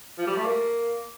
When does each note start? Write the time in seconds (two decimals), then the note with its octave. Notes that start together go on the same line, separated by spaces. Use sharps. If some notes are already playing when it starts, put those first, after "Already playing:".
0.18 F3
0.27 G3
0.37 A3
0.46 A#3